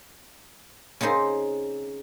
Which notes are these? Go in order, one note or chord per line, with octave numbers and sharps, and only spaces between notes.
C#3 C4 D#4 C5 C6